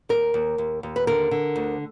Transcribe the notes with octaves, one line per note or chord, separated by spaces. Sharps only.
D#2 A#4
D#2
D#2
D#2
B4
D3 A#4
D3
D2